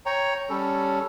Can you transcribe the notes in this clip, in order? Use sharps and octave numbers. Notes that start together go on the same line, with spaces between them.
C#5 G5 A#5
G3 C#4 A4